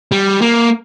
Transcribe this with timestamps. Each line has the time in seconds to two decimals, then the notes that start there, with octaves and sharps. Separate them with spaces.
0.12 G3
0.41 A#3